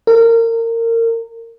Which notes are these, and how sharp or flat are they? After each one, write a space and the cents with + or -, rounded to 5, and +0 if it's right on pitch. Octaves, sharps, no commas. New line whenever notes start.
A#4 -25